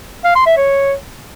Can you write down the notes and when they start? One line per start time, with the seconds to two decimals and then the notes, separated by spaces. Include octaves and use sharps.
0.24 F5
0.35 C6
0.46 E5
0.57 C#5